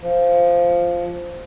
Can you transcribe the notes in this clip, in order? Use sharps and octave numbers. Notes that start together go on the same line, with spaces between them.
F3